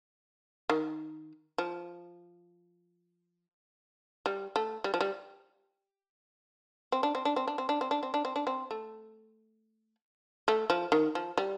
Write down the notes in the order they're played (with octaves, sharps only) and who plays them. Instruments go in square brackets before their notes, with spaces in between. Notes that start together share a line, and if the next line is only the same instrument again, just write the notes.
[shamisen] D#3
F3
G3
A3
G3
F3
G3
C4
D4
C4
D4
C4
D4
C4
D4
C4
D4
C4
D4
C4
D4
C4
A3
A3
F3
D#3
F3
G3